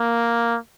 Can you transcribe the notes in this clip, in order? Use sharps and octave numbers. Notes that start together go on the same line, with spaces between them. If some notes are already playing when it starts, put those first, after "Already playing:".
Already playing: A#3